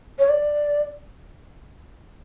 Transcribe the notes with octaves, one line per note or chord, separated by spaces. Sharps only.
C#5
D5